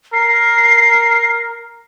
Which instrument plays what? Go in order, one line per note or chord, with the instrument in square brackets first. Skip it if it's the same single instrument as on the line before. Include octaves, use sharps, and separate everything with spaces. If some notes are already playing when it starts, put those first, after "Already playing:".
[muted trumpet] A#4 [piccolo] C7